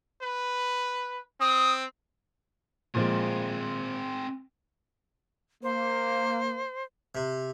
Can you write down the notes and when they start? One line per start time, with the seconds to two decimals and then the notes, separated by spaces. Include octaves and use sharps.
0.22 B4
1.40 C4 D#6
2.95 A#2 F3 G#3 C4 G#4
5.63 A#3 C5
7.15 C3